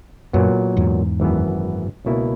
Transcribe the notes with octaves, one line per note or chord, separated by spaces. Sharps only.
F#2 A#2 F#3 B3
E2 G#2
G#1 F#2 E3 B3
C#2 B2 A#3 E4